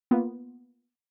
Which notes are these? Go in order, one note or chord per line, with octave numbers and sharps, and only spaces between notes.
A#3 B3 F4